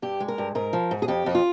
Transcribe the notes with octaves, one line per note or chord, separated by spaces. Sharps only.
G2 G4
G#3
A#4
G2
G#2 A#4
F3
G#2
G#4
F2 G4
F2
F4